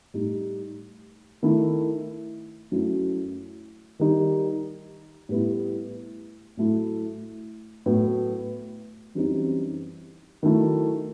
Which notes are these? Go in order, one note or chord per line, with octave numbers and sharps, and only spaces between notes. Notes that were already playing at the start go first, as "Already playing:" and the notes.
A2 G3 D#4
D#3 A3 E4
F#2 F#3 A3 E4
D#3 G3 D#4
A2 G3 B3 E4
A2 F#3 A3 E4
A2 F#3 B3
F#2 E3 G3 C4 D#4
D#3 F#3 A3 E4